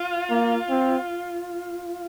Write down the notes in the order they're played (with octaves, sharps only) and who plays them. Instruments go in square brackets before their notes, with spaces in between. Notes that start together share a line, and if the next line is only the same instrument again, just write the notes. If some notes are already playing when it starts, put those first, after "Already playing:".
Already playing: [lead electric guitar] F4
[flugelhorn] A#3
C4